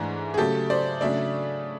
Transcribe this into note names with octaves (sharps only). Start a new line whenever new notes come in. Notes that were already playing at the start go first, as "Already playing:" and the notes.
Already playing: G#2 E3 A3 D4 G#4
G#4
C#3 F#3 A3 G4 A4
C5 D5
C#3 F#3 A3 D4 D5 E5